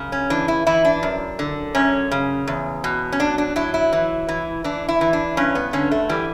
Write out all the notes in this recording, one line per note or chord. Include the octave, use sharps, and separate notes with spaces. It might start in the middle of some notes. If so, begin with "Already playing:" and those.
Already playing: F#2 C#3
C#4
E3 D4
E4
E3 E4
D4
F#2
D3
F#2 C#4
C#3
E2
B2
C#4
F#3 D4
D4
F#3 E4
E4
E3
E3
E3 D4
E4
E3
D4
G2 C#4
B3
D3 C#4
A3
E3 G3